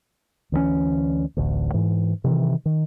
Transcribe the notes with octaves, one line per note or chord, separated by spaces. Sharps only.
D2 E3 G#3 C#4
D1 A1 D2
G#2 E3
C3 D#3 E3
D#3